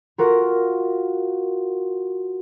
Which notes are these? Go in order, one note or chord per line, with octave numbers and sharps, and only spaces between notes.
F4 F#4 A#4